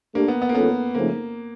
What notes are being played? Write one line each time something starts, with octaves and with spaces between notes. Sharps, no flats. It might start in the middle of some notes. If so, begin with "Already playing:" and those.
A3 A#3 D4 G4
B3
B3
A#3
D#3 G#3 B3 C#4 F4 A4
C#3 F3 A3 A#3 C4 D#4